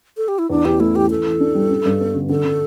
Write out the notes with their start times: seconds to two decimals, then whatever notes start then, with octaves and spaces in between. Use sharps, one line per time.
0.17 A4
0.28 G4
0.39 E4
0.49 E2 D4
0.65 E2 G4
0.80 A3 E4
0.95 E3 G4
1.10 E3 A4
1.25 E3
1.40 D4
1.55 G3
1.70 D4
1.85 G2
2.00 B3
2.15 D3
2.29 D3 A4
2.45 D3